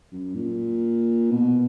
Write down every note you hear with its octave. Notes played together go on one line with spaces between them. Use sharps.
F#2
A#2
B2